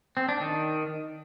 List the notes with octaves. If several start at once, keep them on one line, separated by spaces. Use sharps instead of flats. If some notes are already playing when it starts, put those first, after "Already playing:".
C4
D4
D#3